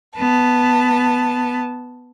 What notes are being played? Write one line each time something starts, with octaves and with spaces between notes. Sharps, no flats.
B3 A5